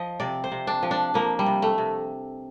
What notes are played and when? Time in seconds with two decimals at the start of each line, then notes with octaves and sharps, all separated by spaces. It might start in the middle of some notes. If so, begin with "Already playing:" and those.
Already playing: F3 D#5
0.20 C3 D5
0.44 C5
0.52 C3
0.67 D4
0.83 F3
0.91 D4
1.14 F3 A#3
1.39 G3
1.46 C3
1.62 A3
1.78 C3